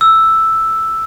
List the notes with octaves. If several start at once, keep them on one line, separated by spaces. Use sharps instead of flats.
E6